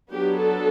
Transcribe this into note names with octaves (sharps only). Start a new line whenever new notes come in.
F#3 B3 D4 G4
A4